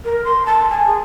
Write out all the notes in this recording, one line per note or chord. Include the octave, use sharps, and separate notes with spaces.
A#4
C6
A5
G#5
G#4